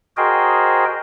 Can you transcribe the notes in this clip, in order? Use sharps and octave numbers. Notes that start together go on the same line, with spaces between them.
F#4 G#4 A#4 C5 D#5 G5